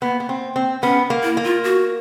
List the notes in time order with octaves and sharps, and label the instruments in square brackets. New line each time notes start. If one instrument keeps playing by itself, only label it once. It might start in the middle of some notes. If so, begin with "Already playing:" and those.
[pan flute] A#3 [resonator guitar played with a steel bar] B3
[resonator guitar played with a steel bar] B3
C4
C4
[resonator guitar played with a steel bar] B3 [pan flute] C#4
[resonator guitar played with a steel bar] A#3
[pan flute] E4
[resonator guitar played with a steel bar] A#3
[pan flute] F4
F#4